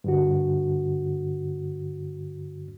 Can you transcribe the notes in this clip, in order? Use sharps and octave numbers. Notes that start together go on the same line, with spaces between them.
G2 D3 F#4